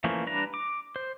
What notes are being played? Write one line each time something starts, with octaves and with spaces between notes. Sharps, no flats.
E3 F3 A3 A#3 C#4
G3 D4 B4 A#5
D6
C5